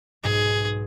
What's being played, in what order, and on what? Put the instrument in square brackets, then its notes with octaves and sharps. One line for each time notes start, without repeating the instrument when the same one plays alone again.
[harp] B1 G#2 C7 [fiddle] G#4